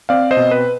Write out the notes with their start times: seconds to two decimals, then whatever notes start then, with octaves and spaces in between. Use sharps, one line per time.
0.09 C4 D5 F5
0.31 C5 D#5
0.37 B2
0.51 B4